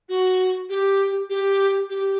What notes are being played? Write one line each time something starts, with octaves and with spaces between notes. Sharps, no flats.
F#4
G4
G4
G4